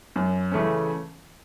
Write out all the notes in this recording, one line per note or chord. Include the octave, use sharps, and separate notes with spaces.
F#2
C#3 E3 A3 C#4